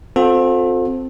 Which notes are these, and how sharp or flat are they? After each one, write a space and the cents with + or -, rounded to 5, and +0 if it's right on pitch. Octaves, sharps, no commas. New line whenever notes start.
C4 +0 F4 +40 A4 +0